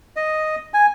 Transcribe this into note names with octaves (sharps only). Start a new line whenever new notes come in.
D#5
G#5